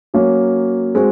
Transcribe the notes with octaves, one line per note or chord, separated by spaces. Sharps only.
F#3 A#3 C#4
G#3 C4 F#4